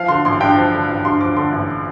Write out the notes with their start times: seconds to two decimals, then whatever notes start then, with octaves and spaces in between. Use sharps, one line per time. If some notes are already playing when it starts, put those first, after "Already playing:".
Already playing: F3 F5
0.08 D3 C6
0.25 A1 C6
0.40 G2 G5
0.56 F3
0.73 D3
0.89 A1
1.05 G2 C6
1.21 F3 D6
1.36 D3 C6
1.52 A1